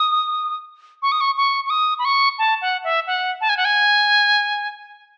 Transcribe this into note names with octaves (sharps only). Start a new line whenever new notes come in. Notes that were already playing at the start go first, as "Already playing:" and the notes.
Already playing: D#6
C#6
D#6
C#6
C#6
C#6
D#6
B5
C#6
A5
F#5
E5
F#5
A5
G#5
F#5
G#5